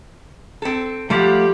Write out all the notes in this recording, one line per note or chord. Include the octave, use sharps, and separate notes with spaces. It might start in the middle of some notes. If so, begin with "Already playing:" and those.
C4 A4
F3 G3 A3 G4 F5 F#5